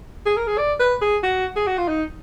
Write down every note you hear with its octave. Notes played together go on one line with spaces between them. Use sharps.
G#4
A#4
G#4
D5
B4
G#4
F#4
G#4
F#4
F4
D#4